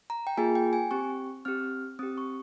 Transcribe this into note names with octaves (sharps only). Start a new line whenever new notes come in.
A#5
G5
A#3 F4 G#4 G#5
G5
G#5
C4 G4 C#6
C4 G4 F6
C4 G4 D#6
C#6